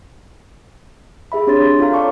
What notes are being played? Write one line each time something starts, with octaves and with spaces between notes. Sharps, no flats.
G4 G#4 E5 B5
C4 D4 G4 C#5 C6 A6
F4 A4 F5 A#5
A4 C#5 D5 A5 C#6 D6